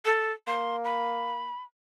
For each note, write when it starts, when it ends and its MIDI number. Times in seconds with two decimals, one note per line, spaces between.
0.05 0.32 69
0.47 1.51 58
0.47 0.77 84
0.85 1.64 83